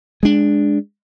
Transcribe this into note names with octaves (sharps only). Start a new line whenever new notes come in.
G#3 D4